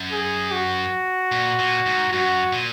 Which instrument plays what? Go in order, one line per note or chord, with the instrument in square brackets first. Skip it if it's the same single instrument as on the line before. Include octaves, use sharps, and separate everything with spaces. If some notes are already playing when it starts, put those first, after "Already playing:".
Already playing: [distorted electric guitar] F#2
[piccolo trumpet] G#4
F#4
[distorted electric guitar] A#2
A#2
G#2
[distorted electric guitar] F#2 [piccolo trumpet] F#4
[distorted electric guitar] A#2